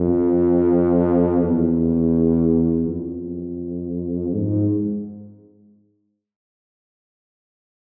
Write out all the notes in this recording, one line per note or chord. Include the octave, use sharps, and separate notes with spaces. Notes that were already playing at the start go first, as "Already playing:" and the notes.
Already playing: F2
E2
F2
G#2